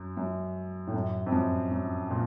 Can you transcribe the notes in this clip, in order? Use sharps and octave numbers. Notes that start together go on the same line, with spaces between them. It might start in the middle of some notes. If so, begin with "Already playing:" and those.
Already playing: F#2
F#2
A2
F#2
F2
F#2
F#2
A#2